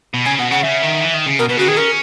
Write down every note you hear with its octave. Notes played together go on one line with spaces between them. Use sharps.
B2
C#3 G#5
B2 F#5
C#3 F#5
C#3 E5
D#3
E3
D#3
C#3
B2 A#4
B2 B4
C#3 F#4
D#3 G#4
C#4 A#4